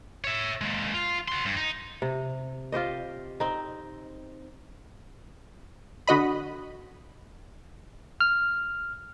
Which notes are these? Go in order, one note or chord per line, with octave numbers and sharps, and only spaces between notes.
C#5 E5
G#3 A#3
F4
F#4 C6
G2
D#4
C3
F4 G4 C5 D#5
C4 D#4
D3 F#4 D#5 B5
F6